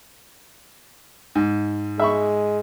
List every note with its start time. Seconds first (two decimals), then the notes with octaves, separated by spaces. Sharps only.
1.35 G#2
2.00 G#3 E5 B5 C#6